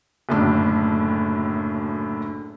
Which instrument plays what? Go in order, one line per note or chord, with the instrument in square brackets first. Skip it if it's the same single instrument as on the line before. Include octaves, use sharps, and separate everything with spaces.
[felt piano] F#1 F#2 A2 D3 D4